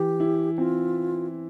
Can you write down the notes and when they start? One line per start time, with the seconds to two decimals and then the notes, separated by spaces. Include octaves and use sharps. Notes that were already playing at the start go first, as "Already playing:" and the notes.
Already playing: E3 G4
0.20 E4
0.58 C4 F4